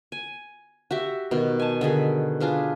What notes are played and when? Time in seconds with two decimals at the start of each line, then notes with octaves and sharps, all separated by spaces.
0.12 G#5
0.91 F#4 G4 E5
1.31 B2 D#3
1.59 G#5 A5
1.81 D3 D#3 G#4 B5
2.40 D4 F4 G#4 B4